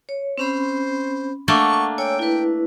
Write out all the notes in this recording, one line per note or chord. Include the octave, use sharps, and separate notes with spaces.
C#5
C4 C#4 C5 B5
A3 A#3 D4 F#5 C#6
C#5 G5 G#5 E6
E4 B4